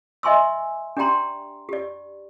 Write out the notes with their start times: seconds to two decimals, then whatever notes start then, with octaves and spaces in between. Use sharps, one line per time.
0.23 D#5 E5 G#5 C6 C#6 E6
0.97 D4 G4 D5 G5 A#5 C6
1.69 G4 D5